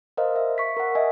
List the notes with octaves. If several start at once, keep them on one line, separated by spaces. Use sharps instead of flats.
A#4 C5 D#5 F5
E5
C#6 B6
A#4 F#5
D#5 E5 G#5